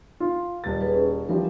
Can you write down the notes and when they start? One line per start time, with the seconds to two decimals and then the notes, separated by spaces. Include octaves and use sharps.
0.20 F4
0.64 D#1 A6
0.81 G#4 B4
0.95 C#4
1.29 E3 F3 G3 A#4